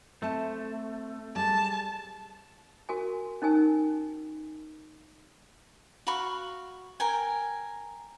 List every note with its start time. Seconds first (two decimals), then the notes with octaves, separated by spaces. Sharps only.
0.22 A3 C4 E5 A5
1.36 G3 G#4 A5
2.89 F#4 A#4 G#5
3.42 C#4 D#4 A#4 G#5 E6
6.07 F#4 F5 B5 C#6
7.00 A#4 G5 G#5